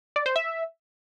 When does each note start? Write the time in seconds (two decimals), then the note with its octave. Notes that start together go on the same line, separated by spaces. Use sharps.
0.16 D5
0.26 C5
0.36 E5